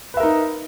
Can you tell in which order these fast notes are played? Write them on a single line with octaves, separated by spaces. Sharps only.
B4 E5 A#4 D#4